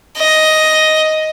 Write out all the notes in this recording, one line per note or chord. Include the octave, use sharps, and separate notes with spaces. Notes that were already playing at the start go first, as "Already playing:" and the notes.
D#5